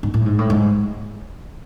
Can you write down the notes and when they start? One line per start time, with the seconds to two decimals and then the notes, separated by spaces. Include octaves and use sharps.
0.03 G#2
0.14 A2
0.26 G#2
0.39 A2
0.50 G#2